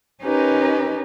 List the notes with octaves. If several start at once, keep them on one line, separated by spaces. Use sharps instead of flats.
C#4 D#4 G4 A#4 B4